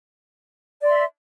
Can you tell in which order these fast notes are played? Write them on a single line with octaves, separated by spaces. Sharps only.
D5 C6 E5